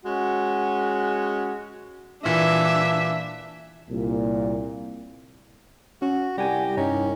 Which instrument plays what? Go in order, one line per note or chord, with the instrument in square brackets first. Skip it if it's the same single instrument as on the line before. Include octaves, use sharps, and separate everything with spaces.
[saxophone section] G#3 C#4 F#4
[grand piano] A#2 E3 A#3 [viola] D4 E5
[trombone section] C2 A#2
[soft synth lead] C#4 [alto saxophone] F#4
[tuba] C2 [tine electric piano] G3 F#5 G#5 [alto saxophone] G4 [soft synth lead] A#6
[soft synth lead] G2 [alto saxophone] C#4 [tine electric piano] D#4